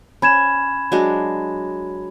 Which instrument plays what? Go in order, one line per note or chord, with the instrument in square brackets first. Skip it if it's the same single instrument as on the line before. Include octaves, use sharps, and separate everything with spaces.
[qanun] C#4 [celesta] B5 G#6 E7
[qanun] F#3 G#3 D4